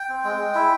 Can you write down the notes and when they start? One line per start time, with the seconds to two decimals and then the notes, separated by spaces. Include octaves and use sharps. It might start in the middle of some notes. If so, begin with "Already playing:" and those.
Already playing: G5
0.09 C4
0.24 G#3
0.39 G#3
0.55 E4